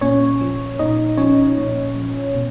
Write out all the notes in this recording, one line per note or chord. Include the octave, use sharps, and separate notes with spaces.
A#2 C#4 C#5
F3
A#2 D#4 D#5
F3 C#4 C#5
A#2
F3
B2